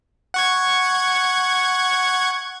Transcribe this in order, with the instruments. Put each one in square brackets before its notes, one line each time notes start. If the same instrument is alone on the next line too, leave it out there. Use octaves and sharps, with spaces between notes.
[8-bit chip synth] F#5 C#6 G#6